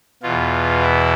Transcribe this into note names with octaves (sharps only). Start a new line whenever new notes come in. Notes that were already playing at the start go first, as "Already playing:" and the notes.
E2 B2 F4
E4